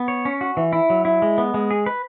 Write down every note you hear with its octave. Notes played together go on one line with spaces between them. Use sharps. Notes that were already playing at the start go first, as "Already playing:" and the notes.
Already playing: B3
C#5
C#4
F#4
E3
E4
F#3
E4
G#3
B3
G#3
G#4
B4